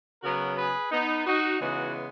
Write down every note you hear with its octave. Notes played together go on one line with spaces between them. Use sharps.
C#3 F#3 B3 F#4 A#4
G#4 B4
B3 D#4
D#4 F#4
C#3 E3 G#3 B3 D#4 F#4